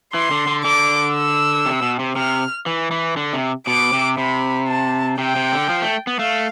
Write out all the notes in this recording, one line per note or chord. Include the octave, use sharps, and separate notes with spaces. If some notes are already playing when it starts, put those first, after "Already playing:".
E3 C6
D3
D3
D3 D6
E6
C3
B2
C3
C3 F6
E3
E3
D3
C3
B2 D6
C3
C3 B5
A5
C3 G5
C3
D3
F3
A3
B3
A3 F5